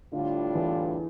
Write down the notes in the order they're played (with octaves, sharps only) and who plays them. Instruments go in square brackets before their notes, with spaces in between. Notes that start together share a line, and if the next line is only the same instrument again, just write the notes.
[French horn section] A2 G3 D4 F4 [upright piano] D3
[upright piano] E2 E3